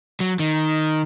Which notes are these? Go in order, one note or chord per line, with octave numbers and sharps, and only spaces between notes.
F#3
D#3